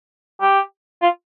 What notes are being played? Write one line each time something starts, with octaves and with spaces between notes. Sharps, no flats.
G4
F4